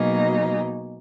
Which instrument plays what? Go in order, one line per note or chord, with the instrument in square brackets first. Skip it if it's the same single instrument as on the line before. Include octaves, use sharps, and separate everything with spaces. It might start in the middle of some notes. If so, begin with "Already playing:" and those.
Already playing: [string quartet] B2 F#3 A#3 D#4 G#4